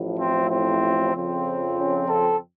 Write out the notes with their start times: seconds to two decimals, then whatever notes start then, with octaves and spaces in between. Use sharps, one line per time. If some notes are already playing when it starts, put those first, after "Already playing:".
Already playing: A1 A2 F3
0.18 C4
0.50 C4
1.13 F2 C#3 F3 C4
1.77 C#4
2.08 A4